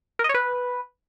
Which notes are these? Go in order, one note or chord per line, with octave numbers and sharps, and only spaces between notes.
A#4
D#5
C#5
B4